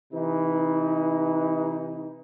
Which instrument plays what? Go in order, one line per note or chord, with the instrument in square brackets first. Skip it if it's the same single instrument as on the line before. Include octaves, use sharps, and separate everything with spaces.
[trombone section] C3 E3 D#4